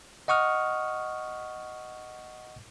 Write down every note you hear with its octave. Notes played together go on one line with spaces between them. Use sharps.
D#5 F#5 C#6 D#6 F6